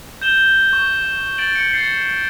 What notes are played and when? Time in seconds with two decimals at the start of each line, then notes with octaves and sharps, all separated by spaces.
0.22 G6 E7 G7
0.73 C#6
1.38 A6 D7 F#7
1.55 C#7
1.73 G6 A6 C7